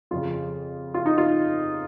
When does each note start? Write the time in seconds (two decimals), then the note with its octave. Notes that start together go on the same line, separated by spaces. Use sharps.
0.11 F2 C#3 F4
0.94 F4
1.06 D#4
1.18 F4